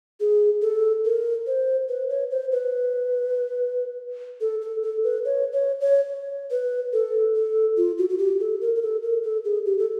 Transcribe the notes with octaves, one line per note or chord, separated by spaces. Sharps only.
G#4
A4
A#4
C5
B4
C#5
C5
B4
A4
A4
A4
B4
C#5
C#5
C#5
B4
A4
A4
F4
F#4
F#4
G4
A4
A#4
A#4
A4
A#4
A4
G#4
G4
A4